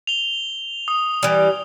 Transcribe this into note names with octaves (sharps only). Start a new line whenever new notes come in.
F7 G7
D#6
E3 G3